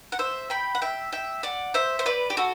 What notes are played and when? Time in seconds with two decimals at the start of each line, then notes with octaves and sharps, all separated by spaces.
0.12 F#5
0.19 C5 E5
0.50 G5 B5
0.75 F#5
0.82 E5 G5
1.12 E5 G5
1.43 D5 F#5
1.74 C5 E5
1.99 C5
2.06 B4 D5
2.30 G4
2.37 F#4 A4